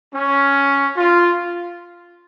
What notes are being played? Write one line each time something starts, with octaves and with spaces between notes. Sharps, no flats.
C#4
F4